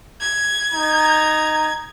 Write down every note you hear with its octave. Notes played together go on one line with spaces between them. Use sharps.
G#6
D#4 A#5